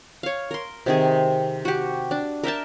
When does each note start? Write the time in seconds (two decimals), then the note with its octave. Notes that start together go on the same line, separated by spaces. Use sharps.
0.23 C#5 F5
0.51 A#4 C6
0.86 C3 D#3 G#4
1.65 F#4 G4
2.11 D4
2.44 A#4 E5 G5 A5